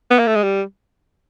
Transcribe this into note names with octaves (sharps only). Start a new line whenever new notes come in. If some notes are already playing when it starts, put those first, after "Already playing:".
B3
A#3
A3
G#3
G3